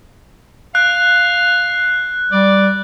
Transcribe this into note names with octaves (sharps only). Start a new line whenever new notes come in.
F5 F#6
G3 D5